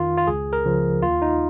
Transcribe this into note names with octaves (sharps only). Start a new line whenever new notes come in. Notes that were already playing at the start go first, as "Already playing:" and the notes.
Already playing: F2 D#3 F4
F4
C#2 G#4
A#4
C#3 F3
D#2 F4
D#4